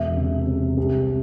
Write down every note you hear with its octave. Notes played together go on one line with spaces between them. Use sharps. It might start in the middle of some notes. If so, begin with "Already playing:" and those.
Already playing: E1 E5
C3
C3
C2